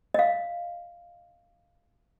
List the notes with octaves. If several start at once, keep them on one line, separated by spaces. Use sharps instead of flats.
D#5 F5